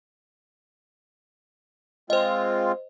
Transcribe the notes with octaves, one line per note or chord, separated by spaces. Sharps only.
G#3 C4 F4 C5 D#5